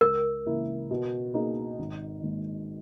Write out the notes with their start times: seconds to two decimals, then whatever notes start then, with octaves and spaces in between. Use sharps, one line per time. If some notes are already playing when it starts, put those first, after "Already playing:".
0.01 C#2 A#4
0.46 C#3 E3 A#3 E4
0.91 B2
1.34 A#3 D#4 G#4
1.79 G#1
2.23 G#2 D#3 A#3